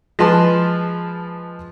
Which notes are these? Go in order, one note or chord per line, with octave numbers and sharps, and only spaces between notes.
F3 G#3 B4 A5 C6